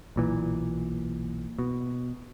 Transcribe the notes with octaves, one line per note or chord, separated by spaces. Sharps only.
B1 A#2 E3
B2